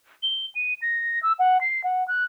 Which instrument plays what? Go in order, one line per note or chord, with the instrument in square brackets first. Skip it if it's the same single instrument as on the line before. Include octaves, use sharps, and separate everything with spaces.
[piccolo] G7
D#7
A#6
E6
F#5
C7
F#5
F#6